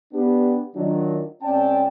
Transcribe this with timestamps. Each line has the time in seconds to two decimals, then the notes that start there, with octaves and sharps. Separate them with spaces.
0.14 B3 D4 G4
0.76 D#3 F#3 D4 F4
1.42 C#2 C4 C#4 D5 G5 A5